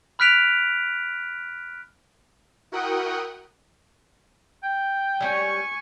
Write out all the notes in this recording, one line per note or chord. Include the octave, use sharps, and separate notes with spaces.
B5 F6 F#6 B6 D7 F7
E4 F#4 A#4 F#5 G5 D#6
G5
G3 A3 C#4 G#5 C#6